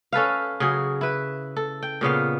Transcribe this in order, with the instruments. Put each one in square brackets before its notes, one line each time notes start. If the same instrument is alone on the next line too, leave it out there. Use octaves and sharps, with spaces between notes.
[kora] C#4 A4 B4 F5
C#3 F#3 G#4
E4 B4
A4
G5
A#2 C#3 B3 F5